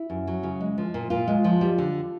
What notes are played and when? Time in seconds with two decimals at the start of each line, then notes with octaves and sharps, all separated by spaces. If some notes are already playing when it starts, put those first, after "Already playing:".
Already playing: E4
0.10 F#2
0.27 F#3
0.43 C#3
0.60 G#3
0.78 F3
0.94 A#2
1.10 A#2 F4
1.28 G#3
1.44 F3
1.61 G3
1.78 D3